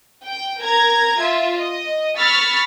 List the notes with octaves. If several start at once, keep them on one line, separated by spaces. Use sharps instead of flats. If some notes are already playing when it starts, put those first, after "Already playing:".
G5
A#4 A#5 G#6
F4 E5
D#5
B5 C#6 E6 F6 A6 B6